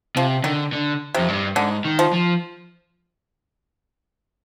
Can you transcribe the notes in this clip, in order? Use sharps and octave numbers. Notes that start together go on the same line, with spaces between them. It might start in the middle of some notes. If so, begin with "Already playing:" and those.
C3 F3
D3 D#3
D3
F2 C3
G2
G#2 D3
D#3
F3
F3